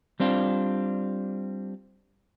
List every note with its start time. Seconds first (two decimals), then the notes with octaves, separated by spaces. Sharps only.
0.20 G3 C4 D4 F4